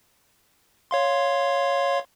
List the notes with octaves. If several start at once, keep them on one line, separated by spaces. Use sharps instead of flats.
C#5 F5 C6